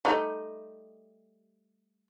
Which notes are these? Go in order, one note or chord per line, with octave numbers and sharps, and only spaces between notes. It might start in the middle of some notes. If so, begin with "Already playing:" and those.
G3 A3 D#4